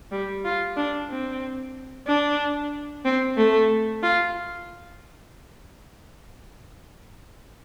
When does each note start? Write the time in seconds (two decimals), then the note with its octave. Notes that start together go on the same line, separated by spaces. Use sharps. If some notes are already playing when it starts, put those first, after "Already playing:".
0.12 G3
0.45 F4
0.76 D4
1.10 C4
2.07 D4
3.05 C4
3.37 A3
4.03 F4